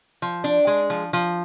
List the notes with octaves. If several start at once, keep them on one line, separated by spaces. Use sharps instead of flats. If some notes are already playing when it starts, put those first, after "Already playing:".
F3
D4
G#3
F3
F3